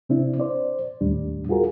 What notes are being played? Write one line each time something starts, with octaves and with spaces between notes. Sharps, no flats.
C3 C4 D4 E4
C5 D5
D#2 A2 G3 D4
F4 F#4 G#4 A#4